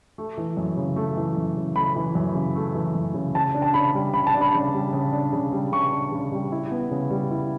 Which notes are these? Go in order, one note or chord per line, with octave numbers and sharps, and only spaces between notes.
A3
E3
F#2
C#3
A3
E3
F#2
C#3
A3 B5
E3
F#2
C#3
A3
E3
F#2
C#3
C#3 A5
D4
A5
C#3 B5
G3
C#3 B5
A5
D4
B5
C#3
G3
C#3
D4
C#3
G3
C#3 C#6
D4
C#3
G3
E4
B3
C#3
G3
E4